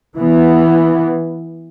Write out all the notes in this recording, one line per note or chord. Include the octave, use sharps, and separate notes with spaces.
E3 B3